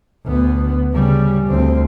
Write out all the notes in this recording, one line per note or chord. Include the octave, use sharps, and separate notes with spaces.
D2 B3
C#3 G3
D2 C4